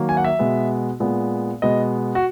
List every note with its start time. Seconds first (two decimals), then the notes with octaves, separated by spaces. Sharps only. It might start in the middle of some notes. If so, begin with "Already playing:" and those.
Already playing: D#3 F#3 A#3
0.09 G#5
0.17 F#5
0.24 E5
0.39 B2 G#3 B3
1.00 A#2 G#3 B3
1.62 B2 G#3 B3 D#5
2.15 F#4